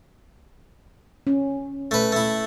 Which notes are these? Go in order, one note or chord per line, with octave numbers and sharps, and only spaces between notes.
C#4
A3 B4
A3 E4